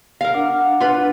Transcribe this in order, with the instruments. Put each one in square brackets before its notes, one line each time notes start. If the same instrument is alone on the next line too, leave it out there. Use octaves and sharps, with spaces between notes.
[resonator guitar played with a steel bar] A#4 F5
[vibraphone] D4 [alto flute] F#5
[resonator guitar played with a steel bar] F4 B4